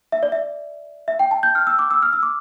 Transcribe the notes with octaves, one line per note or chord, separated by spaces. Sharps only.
E5
D5
E5
E5
G5
A5
G6
F6
E6
D6
E6
F6
E6
D6